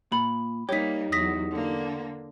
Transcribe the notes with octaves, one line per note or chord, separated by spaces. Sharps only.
A#2 B5
G3 A#3 D#4 G4 C#5 B6
E2 F#3 D#6 A#6 B6
D3 A#3